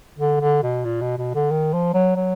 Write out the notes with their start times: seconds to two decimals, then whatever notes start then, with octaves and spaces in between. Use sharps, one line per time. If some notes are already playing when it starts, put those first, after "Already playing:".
0.19 D3
0.40 D3
0.63 B2
0.85 A#2
1.01 B2
1.18 B2
1.34 D3
1.51 D#3
1.73 F3
1.94 F#3
2.16 F#3